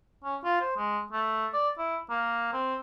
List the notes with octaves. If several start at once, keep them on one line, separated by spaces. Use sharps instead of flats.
C#4
F4
C5
G#3
A3
D5
E4
A#3
C4